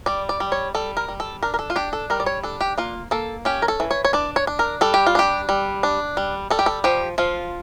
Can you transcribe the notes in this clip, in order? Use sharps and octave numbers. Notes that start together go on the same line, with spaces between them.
G3 D5
D5
G3
C#5
G3 A4
A#4
G3
A4
D4 A#4
A#4
A4
F4
D4 G4
A4
G3 A#4
D5
C#5
D4 A4
G4
A#3 F4
A#3 A4
C#4 G4
A#4
A4
E3
C#5
C#5
D4 D5
C#5
D4
A#4
G3 A4
G4
F4
D4 G4
G3
D4
G3
G3 A4
G4
A4
F3 G4
F3 F4